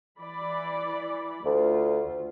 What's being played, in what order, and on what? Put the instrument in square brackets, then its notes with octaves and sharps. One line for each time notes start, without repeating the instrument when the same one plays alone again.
[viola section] E3 D5 B5
[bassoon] D2 [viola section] A3 F4